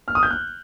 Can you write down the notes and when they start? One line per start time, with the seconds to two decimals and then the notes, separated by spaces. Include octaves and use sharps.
0.08 F6
0.15 D#6
0.23 G6
0.30 F#6